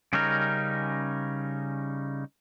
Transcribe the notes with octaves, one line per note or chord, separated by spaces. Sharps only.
C#3 G3 C#4 D#4 A#4